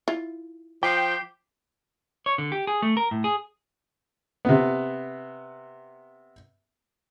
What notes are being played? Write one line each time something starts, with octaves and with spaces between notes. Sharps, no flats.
E4 F4
F3 G5 D6 B6 C7
C#5
D3
G4
G#4
A3
A#4
A2
G#4
C3 B3